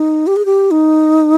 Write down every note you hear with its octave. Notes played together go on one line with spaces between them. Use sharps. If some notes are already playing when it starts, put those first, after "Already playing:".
Already playing: D#4
G4
G#4
G4
D#4